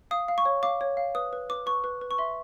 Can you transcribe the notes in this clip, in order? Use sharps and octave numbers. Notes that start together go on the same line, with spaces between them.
F5 D#6
F5
C#6
C#5
F5 D6
C#5
F5
B4 D#6
B4
B4 D6
B4 C#6
B4
B4
C#6
E5 C6